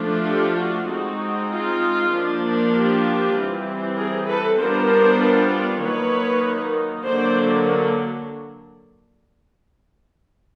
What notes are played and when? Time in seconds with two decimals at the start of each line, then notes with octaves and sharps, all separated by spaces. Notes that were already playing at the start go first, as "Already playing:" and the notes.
Already playing: F3 A3 D4 F4
0.27 G4 A4
0.57 F#4
0.89 G#3 C4 D#4 F#4
1.51 F4
2.11 F3 A#3 D4
2.73 F4 G4
3.35 E3 G3 C4
3.97 G#4 A#4
4.27 A4 B4
4.58 G3 B3 D4 F4 A#4 C5
5.81 D#3 F#3 A#3 D#4 B4 C#5
7.04 D3 F#3 A#3 D4 C5 D5